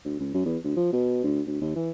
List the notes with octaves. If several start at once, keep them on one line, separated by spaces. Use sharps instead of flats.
D2
C#2
F#2
E2
D2
F3
B2
D2
D2
D#2
E3